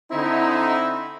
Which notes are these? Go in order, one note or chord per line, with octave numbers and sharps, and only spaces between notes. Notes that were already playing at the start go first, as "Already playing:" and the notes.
D3 C4 D#4 E4